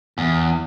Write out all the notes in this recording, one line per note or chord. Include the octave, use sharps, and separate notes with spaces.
E2